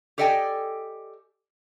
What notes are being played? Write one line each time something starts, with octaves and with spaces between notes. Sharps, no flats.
G4 A4 D5 D#5 G5 G#5